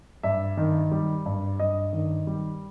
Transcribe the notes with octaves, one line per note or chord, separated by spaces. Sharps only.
G2 E5
D#3
G3
G2
G2 D#5
D#3
G3